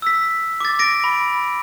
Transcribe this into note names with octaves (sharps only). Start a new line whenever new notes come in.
E6 B6
D6 A6
A6 A#6 D7
B5